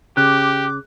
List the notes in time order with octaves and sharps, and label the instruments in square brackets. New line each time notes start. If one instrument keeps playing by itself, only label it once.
[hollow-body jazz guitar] C#3 [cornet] G4 [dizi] D6 [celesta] F#6